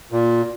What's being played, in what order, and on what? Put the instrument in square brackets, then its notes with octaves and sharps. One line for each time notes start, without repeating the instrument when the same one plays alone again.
[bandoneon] A#2